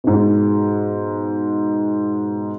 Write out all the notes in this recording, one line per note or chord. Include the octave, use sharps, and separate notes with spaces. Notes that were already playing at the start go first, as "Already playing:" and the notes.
G#2 B2